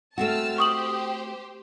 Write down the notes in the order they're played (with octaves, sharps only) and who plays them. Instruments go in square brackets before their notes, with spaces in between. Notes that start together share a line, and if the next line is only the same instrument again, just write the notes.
[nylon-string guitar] A3 C4 F#4 [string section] A5 E6 F6
[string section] G4 C5 [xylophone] C#6 D#6 F#7